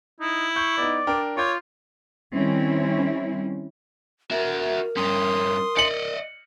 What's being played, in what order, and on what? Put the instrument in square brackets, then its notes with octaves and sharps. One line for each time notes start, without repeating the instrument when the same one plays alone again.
[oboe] D#4 [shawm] E4
[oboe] C#6 [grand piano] G6
[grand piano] B3 D#4 [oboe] D5
[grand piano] D4 A#4 G5
[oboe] F4 [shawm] C#5 [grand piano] D6 G6
[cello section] D#3 G3 C4 C#4 E4
[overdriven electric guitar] F#4 E5 [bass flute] A#4
[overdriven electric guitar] G2 C#4 [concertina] C6 D#6
[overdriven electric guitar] D5 D#5 [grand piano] C#7 F#7